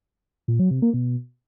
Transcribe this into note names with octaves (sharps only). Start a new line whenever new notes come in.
A#2
F#3
C3
A#3
B2